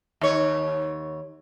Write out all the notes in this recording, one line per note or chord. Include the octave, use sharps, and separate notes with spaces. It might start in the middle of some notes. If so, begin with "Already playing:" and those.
D#2 C#5